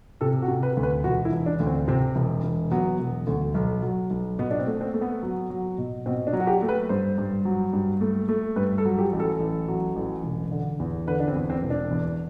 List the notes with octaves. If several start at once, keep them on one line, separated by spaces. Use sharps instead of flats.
C3 A4
F#4
C3
B4
D2
B4
E1 F#4
E4
E1
D4
D2
C4
C3 C4
E1
E1
F#3 B3
E1
D2
B1
F#3
B1
B2 B3
D4
C4
A3
C4
A3
B3
F#3
F#3
B2
B2 C4
D4
F#3
F#4
G4
A3
B4
G2 C5
G2
F#3
G2
A3
A3
G2 B4
A4
F#3
G4
A1
A4
A1
F#3
A1
E1
D3
E2
D3 B4
D4
C4
E2
C4
E1
D4
E2